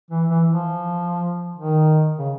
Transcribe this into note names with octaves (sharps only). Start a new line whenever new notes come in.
E3
E3
F3
D#3
C#3